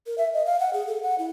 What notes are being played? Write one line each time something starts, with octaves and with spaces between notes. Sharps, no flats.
A#4
E5
D#5
F5
F#5
G#4
A4
F#5
E4